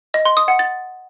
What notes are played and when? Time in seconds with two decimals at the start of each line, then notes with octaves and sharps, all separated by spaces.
0.14 D#5
0.25 C6
0.37 D#6
0.48 F#5
0.59 A6